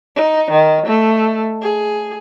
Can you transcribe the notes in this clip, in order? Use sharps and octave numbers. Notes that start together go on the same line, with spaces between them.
D#4
D#3
A3
G#4